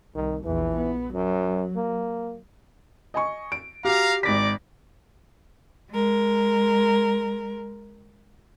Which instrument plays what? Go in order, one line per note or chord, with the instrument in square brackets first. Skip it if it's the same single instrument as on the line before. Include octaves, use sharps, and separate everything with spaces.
[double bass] C2 [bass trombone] D#3
[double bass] A#1 E2 [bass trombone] E3
[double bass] B3
[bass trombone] F#2 [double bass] F#3
[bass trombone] A#3
[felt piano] D#5 G#5 C#6
D7
[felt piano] F#4 G4 [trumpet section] F5 A#5
[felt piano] G#1 A#6 B6 [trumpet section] D5 D6
[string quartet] G#3 A#4